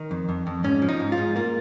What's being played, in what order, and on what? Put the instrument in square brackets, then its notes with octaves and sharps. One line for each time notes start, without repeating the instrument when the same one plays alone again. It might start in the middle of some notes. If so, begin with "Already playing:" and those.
Already playing: [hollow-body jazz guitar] D#3 D#4
F2
F2
F2
G#2 C#4
F3
D#4
G#2
F4
G#2
A#3 F4